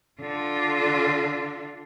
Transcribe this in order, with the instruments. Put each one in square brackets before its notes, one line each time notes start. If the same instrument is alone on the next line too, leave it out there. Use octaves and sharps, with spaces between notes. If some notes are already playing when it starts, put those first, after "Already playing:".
[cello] D3 F4